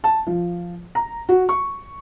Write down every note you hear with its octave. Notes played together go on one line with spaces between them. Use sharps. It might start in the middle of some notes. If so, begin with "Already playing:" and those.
A5
F3
A#5
F#4
C#6